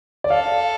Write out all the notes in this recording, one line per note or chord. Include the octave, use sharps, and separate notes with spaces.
D5
A4 F5